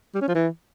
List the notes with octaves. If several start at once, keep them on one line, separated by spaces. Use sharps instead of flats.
G3
C#4
F3
E3